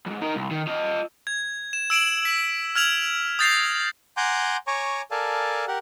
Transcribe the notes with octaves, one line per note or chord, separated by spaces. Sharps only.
F2 G#2
D#4 A#4
C2
D#3
F4 D#5
G#6
E7
E6 D7 E7 F#7
B6
F6 G#6 F7 F#7
D#6 G6 A6 A#6 C7 F7
F#5 G#5 A#5 C6 D6 G6
C#5 G#5 A#5 C#6 D6
A4 A#4 D5 F5 G#5 A5
G4 A#4 F#5